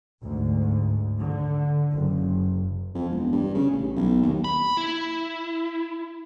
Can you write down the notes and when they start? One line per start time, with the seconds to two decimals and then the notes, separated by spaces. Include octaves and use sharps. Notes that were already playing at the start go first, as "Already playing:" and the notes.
0.23 D2 G#2
1.19 D3
1.92 F#1
2.95 F2
3.10 E1
3.32 G2
3.55 C#3
3.71 A1
3.96 B1
4.22 D#2
4.44 B5
4.77 E4